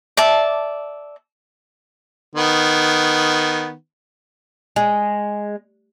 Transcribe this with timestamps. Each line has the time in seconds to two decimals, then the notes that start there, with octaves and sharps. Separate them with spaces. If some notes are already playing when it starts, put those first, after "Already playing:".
0.17 D5 E5 A5
2.35 D#3 B3
4.76 G#3